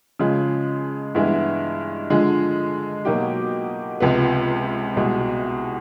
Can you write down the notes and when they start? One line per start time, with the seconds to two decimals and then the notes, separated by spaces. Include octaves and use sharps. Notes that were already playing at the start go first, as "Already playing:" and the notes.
0.19 C#3 F3 G#3
1.15 G2 E3 G#3 B3 E4
2.10 D3 F3 G#3
3.05 B2 F#3 A#3 D#4 G4
4.00 C#2 C3 F3 G#3 B3
4.96 C2 B2 G#3